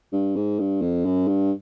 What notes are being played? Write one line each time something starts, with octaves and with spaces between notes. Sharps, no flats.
G2
G#2
G2
F2
F#2
G2